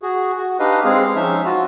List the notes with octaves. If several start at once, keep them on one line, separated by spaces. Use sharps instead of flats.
F#4 G#4
F#4
D4 D#4 G4 B4 D#5 F5
G#3 C4 G#4 F5
F3 C#4 D#4 E5
F4 F#4